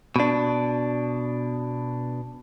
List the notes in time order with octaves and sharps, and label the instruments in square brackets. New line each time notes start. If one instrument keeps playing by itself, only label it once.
[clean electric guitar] B2 D4